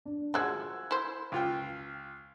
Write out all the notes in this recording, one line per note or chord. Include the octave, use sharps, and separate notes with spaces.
D4
F3 G#3 F#4 E6 F#6 G#6
E4 C5
C#2 F4 G5